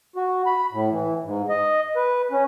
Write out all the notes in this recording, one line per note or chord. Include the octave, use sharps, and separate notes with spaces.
F#4
B5
A2
E3
G#2
D#5
B4
C#4